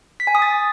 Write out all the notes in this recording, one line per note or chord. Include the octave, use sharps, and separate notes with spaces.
B6
G#5
D#6
A6